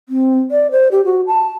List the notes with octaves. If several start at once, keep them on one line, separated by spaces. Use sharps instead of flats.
C4
D5
C5
G4
F#4
A5